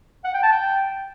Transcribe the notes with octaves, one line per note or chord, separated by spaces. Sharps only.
F#5
G5
A5
G5